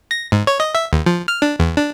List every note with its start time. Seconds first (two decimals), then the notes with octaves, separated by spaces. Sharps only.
0.11 A#6
0.32 G#2
0.47 C#5
0.60 D#5
0.75 E5
0.93 D#2
1.06 F3
1.28 F6
1.42 D4
1.59 E2
1.77 D4